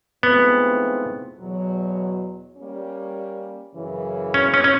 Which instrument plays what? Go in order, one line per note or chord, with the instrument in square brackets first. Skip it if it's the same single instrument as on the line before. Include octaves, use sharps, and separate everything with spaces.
[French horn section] G#2 E3 A3 C4 F4 [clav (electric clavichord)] B3
[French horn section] E2 B2 F#3
G3 A#3 C#4
F#2 C#3 E3
[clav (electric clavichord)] C#4
C#4
C#4